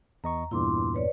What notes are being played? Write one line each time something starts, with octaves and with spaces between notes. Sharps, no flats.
E2 D#5 A#5 C#6
E2 G2 A#2 E4 C6 D6
B4 C#5 D5